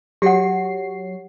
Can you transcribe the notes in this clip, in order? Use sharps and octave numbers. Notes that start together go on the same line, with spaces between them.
F#3 G4 C#5 F#5 C7